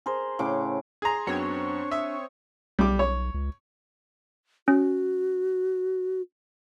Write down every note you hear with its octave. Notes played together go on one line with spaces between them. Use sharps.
G#4 A#4 C5
A2 C#3 D6
G#4 A#5 C6 G#6
F#2 B3 C4 D4 F#4 C#5
E5 D#6
B1 G3 D6
C#5
C#2
C#4 F#4